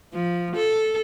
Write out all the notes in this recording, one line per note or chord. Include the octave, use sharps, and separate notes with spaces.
F3
A4